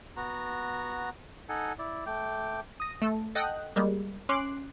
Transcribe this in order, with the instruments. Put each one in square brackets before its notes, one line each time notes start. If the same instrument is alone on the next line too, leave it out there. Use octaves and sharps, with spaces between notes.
[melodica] B3 F#4 A#5
D#4 A4 F#5 G#5
E4 D5
A3 G5 D6
[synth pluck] D#6 A#6
A3 A4
A4 D#5 F#5 G5 D#6 F#6
G3 G#3 A#3
C#4 C6 D6 F#6 C7